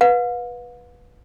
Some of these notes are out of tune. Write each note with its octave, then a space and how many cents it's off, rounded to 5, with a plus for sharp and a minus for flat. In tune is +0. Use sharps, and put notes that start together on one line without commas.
B4 -10 F5 +45